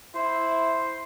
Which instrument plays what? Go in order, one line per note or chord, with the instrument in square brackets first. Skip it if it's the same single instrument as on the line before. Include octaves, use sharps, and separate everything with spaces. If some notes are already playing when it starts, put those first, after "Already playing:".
[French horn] E4 [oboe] C5